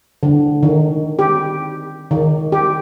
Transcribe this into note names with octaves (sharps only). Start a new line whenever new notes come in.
D3
D#3
G4
D#3
G4